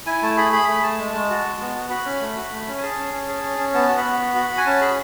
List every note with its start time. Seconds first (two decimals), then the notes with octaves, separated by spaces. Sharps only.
0.07 E4 G#5
0.22 A3 A5
0.37 G#4 B5
0.52 G#4 B5
0.68 A3 B5
0.83 A3 A5
0.99 G#3
1.14 G#3
1.30 F#4
1.45 G#3
1.60 B3
1.75 F#4
1.90 F#4 B5
2.05 C#4
2.21 A3
2.36 F#4
2.52 A3
2.67 C#4
2.78 G#5
2.82 G#4 A5
2.98 C#4
3.13 C#4
3.28 G#4
3.43 C#4
3.58 C#4
3.74 B3 A5
3.89 F#4
3.97 B5
4.04 B3
4.20 F#4
4.35 F#4
4.50 F#4
4.58 G#5
4.66 C#4 A5
4.81 G#4 B5